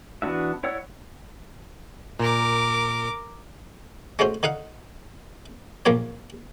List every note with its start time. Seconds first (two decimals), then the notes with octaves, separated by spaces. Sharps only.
0.22 E3 B3 D4 F#4 E5
0.63 E4 C#5 D5 F#5 E6
2.19 A#2 A#4 D6
4.19 G#3 A3 C#4 F#4 C5
4.43 D3 D#4 F5 F#5
5.86 A#1 F#2 A#3 F4 C#5